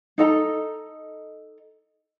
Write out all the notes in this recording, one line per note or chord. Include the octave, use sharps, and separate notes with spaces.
D#4 A4 D#5 A#5